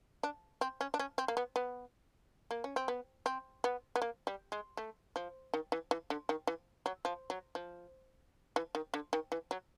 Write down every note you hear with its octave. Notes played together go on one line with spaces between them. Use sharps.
D4
C4
C#4
D4
C#4
C4
A#3
B3
B3
A#3
C#4
C4
B3
C4
B3
B3
A#3
G3
G#3
A3
F3
D#3
E3
E3
D3
D#3
E3
F#3
F3
F#3
F3
E3
D#3
D3
D#3
E3
F#3